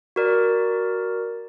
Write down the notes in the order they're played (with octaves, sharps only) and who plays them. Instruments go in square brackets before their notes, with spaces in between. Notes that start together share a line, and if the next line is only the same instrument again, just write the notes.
[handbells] F#4 A#4 D5